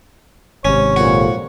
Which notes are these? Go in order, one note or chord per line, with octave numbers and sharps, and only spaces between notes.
G#1 C3 C#4 C#5
F2 A#2 F#4